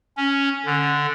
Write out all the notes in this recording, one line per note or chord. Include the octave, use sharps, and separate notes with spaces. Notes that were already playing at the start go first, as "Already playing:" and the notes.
C#4
D3